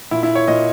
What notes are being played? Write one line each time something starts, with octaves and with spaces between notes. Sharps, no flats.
A#2 E4
E4
C#5
A#2 D#5